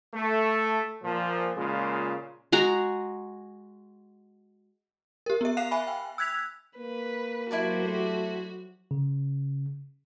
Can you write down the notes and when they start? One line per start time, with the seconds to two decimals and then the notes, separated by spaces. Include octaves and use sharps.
0.14 A3
1.03 A#2 F3
1.57 A#2 C#3 G#3 F4
2.52 G#3 F#4 A#5
5.26 G4 A#4
5.41 B3 E5
5.57 F5 F#6 C7 F7
5.71 E5 G#5 B5
5.87 G5
6.18 E6 F#6 G#6 B6 F7
6.78 A#3 B4
7.51 F#3 E4 F#4 G4 C5 D5 A5
7.84 A3
8.91 C#3